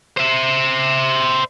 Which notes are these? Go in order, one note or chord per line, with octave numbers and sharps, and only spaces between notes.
C5 E5